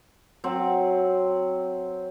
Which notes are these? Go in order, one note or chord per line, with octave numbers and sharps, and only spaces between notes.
F#3 C4